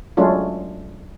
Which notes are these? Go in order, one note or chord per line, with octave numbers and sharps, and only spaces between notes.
F#3 G#3 A3 C#4 D4 F4